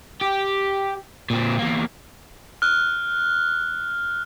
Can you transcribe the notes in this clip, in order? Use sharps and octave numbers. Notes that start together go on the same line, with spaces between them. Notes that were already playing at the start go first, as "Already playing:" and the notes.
G4
A#2 C4
E2 A#3
F6 F#6